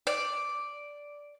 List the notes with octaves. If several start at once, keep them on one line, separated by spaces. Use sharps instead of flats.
D5